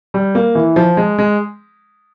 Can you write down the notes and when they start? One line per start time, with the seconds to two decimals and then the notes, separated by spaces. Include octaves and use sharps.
0.14 G3
0.35 A#3
0.55 E3
0.76 F3
0.97 G#3
1.18 G#3